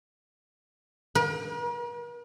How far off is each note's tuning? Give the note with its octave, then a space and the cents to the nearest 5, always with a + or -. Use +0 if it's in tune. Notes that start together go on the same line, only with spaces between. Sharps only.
A#4 +45